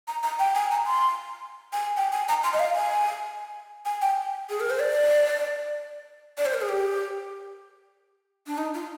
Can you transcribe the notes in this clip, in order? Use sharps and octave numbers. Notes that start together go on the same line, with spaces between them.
A#5
A#5
G5
G#5
A#5
C6
G#5
G5
G#5
A#5
C6
D#5
F5
G#5
G#5
G5
G#4
A#4
C5
D5
D5
C5
A#4
G#4
G4
D4
D#4
F4